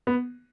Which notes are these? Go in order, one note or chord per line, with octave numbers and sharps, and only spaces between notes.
B3